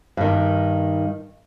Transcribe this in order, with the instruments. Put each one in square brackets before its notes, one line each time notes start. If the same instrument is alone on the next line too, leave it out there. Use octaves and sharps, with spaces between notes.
[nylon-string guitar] G2 D#3